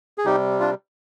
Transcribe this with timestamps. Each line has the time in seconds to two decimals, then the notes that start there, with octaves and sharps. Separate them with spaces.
0.18 G#4
0.25 C3 G3 D#4 G4
0.60 D4 F4